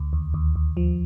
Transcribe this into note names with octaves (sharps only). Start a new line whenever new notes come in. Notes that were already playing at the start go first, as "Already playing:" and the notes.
Already playing: D2
D#2
D#2
D#2
F3